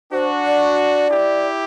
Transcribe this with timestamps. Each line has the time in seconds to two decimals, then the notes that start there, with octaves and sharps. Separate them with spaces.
0.12 D4 F#4 C5
0.44 D5
1.09 E4 G4